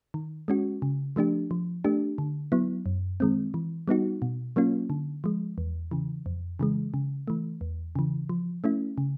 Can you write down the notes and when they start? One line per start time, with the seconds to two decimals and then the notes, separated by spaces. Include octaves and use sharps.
0.14 D#3
0.48 G#3 C#4 F#4
0.82 C#3
1.16 F3 A3 D4 G4
1.51 F3
1.84 A3 D4 G4
2.18 D3
2.52 F#3 B3 E4
2.86 F#2
3.20 D#3 G#3 C4
3.54 E3
3.88 G3 B3 D#4 F#4
4.22 B2
4.56 F#3 A#3 C#4 F4
4.90 D3
5.24 F3 G#3
5.58 E2
5.91 C#3 E3
6.26 F2
6.59 C#3 E3 G#3
6.94 C#3
7.28 E3 A3
7.61 E2
7.96 C#3 E3
8.29 F3
8.64 A3 C#4 E4
8.98 C#3